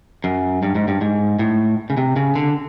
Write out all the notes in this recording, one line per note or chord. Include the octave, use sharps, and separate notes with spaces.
F#2
G2
G#2
G2
G#2
A2
C#3
C3
C#3
D3